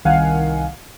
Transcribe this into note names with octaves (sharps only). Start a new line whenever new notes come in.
C2 D#3 F5 F#5 G#5